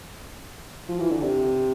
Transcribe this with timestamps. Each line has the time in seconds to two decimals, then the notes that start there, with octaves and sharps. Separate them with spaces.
0.89 F3
1.00 E3
1.11 D3
1.23 C3